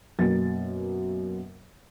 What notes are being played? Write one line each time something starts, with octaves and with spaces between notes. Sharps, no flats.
F#2 B2 A#3 A6